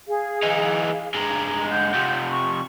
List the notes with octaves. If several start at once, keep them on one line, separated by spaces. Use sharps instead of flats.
G#4 F5
E3 D#4
G2 G#3 A#5
F#5 G6
F2 C3
C#6